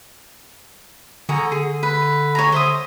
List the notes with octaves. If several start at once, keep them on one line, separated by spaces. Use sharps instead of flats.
D3 F#4 G#4 A#5
G#4
B4
C#5 G#5 A#5
C5 E5 D#6